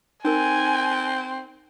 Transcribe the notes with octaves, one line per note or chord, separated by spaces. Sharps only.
C4 D#4 A#4 G#5